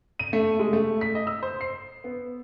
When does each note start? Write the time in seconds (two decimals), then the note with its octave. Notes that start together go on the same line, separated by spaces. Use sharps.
0.19 D#7
0.33 A3
0.59 G#3
0.73 A3
1.01 B6
1.15 D#5
1.27 E6
1.43 C5
1.61 C7
2.04 B3